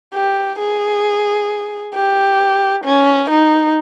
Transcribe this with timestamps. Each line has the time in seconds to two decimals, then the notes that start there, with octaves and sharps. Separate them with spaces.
0.14 G4
0.59 G#4
1.95 G4
2.84 C#4
3.30 D#4